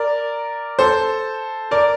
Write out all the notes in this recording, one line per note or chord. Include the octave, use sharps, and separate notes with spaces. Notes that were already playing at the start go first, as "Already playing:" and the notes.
Already playing: A#4 D5
A4 C5
A#4 D5